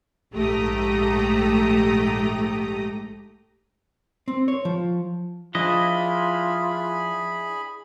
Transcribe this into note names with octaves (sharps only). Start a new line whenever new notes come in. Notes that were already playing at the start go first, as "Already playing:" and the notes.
A#1 G#2 A3 G4 A#5 D#6
C4
C#5
F3
F3 D4 E4 F4 G#4 D#5 B5